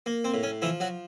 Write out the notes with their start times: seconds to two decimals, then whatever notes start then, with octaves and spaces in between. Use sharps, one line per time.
0.06 A#3
0.24 C4
0.34 A2
0.43 C#4
0.62 E3 F3 E4
0.80 F#3 F#4